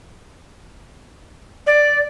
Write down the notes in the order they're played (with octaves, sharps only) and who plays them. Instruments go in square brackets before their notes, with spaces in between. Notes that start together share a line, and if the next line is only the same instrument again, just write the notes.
[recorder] D5